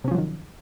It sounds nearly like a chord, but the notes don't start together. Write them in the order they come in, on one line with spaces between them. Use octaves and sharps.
C3 C#4 F3 F#3 D#3